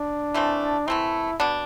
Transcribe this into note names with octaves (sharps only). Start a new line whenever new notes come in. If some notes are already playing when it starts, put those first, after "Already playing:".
Already playing: D4
E3 A3 C4
E3 A3 C4 E4
B2 B3 D4